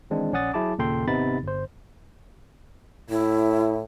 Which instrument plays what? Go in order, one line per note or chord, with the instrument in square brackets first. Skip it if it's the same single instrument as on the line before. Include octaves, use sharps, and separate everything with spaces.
[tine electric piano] D#3 E3 G#3 C4 D4
A#1 C#4 D5 F#5 D#6 A6
F#3 E4 G#4 A5 D6
D#2 A#2 C#3 A4 G5 C6
G#1 C3 B3 D#4 B5 A6
G1 C5
[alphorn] A2 [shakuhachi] E4